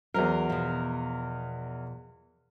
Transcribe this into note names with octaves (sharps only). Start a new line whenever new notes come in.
E2 F#3 A#4 C5
B2 F3